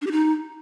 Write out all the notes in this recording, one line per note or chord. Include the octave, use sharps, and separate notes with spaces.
D4
G4
D#4